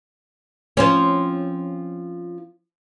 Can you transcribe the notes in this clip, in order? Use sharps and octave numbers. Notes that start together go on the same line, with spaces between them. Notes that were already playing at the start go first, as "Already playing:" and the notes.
F3 C4 C#4